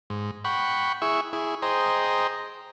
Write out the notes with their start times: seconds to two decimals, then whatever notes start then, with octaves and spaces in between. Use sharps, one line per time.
0.10 G#2
0.45 F#5 G5 B5 C#6
1.02 E4 G#4 E5 C#6
1.33 E4 G#4
1.62 G#4 C5 D#5 G5 A#5